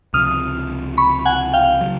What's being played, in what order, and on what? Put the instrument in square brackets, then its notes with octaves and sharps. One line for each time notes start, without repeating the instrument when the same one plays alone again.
[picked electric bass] C#2 C3 F3 [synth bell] D#6 F6
[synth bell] B5 C#6
F#5 G#5
F5 G5
[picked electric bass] C#3 F#3